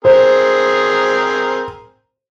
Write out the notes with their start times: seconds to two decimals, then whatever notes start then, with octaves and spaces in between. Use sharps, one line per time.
0.05 C4 G#4 A#4 C5